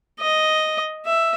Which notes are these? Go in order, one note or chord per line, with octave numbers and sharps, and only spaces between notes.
D#5
E5